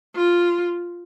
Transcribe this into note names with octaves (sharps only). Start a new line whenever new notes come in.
F4